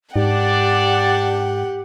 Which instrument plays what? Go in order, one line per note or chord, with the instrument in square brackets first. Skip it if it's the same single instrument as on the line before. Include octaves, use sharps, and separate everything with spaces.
[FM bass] G#2 [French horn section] D4 D5 [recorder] G4 [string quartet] F#5 G5